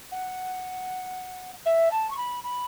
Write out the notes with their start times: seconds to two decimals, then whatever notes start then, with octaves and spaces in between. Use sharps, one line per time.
0.12 F#5
1.65 E5
1.91 A5
2.10 C#6
2.17 B5
2.44 B5